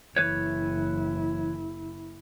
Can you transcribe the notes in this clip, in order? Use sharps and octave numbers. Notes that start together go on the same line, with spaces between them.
F#1 E3 E4 B4 C#5